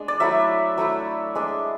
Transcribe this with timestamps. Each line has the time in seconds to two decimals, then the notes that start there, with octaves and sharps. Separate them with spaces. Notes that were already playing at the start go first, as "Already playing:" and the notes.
Already playing: G#3 D4
0.08 D5
0.20 F#3 A3 E4 E5
0.78 F#3 A3 E4
1.35 G#3 D4